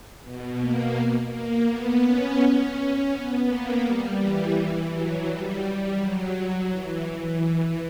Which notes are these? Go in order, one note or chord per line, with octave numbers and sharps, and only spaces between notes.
B2
A#3
A#3
B3
C#4
C#4
B3
A#3
G3
E3
E3
F#3
G3
G3
F#3
F#3
E3
E3